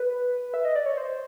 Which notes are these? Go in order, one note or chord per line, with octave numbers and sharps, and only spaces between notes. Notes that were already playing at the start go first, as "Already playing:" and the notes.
Already playing: B4
E5
D#5
D5
C#5
C5